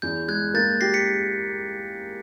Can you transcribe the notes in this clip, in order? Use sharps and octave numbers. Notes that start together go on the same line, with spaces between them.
E2 G6
G#3 F#6 G#6
A#3 G6 A6
G4 A#6 C7
B6 C#7